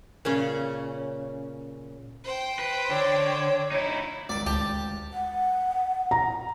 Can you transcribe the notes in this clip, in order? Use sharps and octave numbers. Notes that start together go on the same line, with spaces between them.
A#2 C#3 C#4
C5 G5
B4
D3 C#5
D#4 E4
G#1 C#2 D5
D2 G4 A5
F#5
A#5